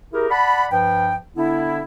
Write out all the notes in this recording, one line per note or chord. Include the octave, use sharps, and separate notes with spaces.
E4 G4 G#4 A#4
D5 F#5 A5 B5
G2 F3 B4 G5
D3 B3 D4 E4